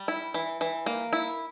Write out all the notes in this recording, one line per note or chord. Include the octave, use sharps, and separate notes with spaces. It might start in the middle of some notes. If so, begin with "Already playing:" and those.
Already playing: G3
E4
E3
E3
A#3
E4